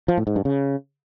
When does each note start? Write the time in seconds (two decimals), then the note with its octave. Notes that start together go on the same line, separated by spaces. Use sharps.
0.08 F3
0.18 A2
0.27 G#2
0.36 G2
0.45 C#3